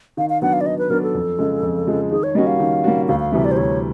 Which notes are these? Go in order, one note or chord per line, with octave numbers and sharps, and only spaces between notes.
D#3 F5
F5
F#3 B3 D4 F#5
F5
D5
D#3 D#5
B4
F#3 B3 D4 A#4
A4
F2
C#3 F3 G#3
F2
C#3 F3 G#3
D#3 G#4
C#5
G3 A#3 C#4 F#4 D#5
F5
D#3
G3 A#3 C#4 F#4
D2 F5
F5
C3 E3 G3 E5
D5
C5
D2 C#5